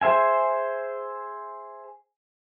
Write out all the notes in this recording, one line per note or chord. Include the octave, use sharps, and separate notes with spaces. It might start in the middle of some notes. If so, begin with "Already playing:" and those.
G#4 C5 E5 G#5